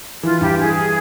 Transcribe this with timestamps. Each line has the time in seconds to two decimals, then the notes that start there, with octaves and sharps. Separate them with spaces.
0.23 E3 F4
0.41 G2 G4
0.59 E3 G#4